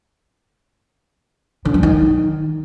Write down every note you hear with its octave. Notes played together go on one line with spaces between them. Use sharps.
D3
F3
D#3